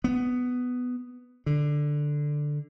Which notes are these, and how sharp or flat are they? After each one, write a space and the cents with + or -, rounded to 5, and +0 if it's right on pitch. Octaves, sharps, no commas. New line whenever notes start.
B3 +10
D3 +5